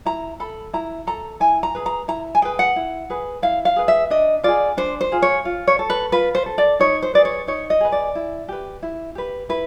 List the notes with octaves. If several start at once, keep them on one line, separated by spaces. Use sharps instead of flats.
E4 A#5
A4 B5
E4 A#5
A4 A#5
E4 G#5
A#5
G#4 B4
A#5
E4 A#5
G#5
G#4 B4 G5
F#5
E4
G#4 B4
E4 F5
F5
G#4 B4
E5
D4 D#5
F4 G#4 D5
D4 C5
C5
F4 G#4
C#5
F4
C#5
A4
B4
F4 B4
C5
A4
D5
D#4 C#5
C5
G#4 B4 D5
C#5
D#4 C#5
D#5
G#4 B4
D5
E4
G4 B4
E4
G4 B4
E4 B4